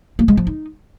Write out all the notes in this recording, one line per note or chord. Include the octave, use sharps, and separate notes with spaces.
A#3
G#3
F3
D#4